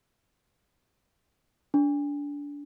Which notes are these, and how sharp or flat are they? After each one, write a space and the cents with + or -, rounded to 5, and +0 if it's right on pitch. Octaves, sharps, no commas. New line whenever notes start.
D4 -25